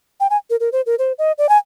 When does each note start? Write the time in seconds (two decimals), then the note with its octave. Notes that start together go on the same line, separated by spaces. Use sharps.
0.20 G5
0.30 G#5
0.50 A#4
0.60 A#4
0.72 C5
0.86 A#4
0.99 C5
1.18 D#5
1.38 D5
1.49 G#5